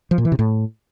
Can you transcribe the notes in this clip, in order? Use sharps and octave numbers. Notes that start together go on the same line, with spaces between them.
F3
A#2
E3
C3
A2